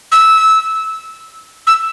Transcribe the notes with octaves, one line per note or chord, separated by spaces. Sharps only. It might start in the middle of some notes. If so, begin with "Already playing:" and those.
E6
E6